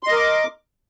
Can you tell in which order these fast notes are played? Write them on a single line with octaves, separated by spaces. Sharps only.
C6 D#5 A#4 D6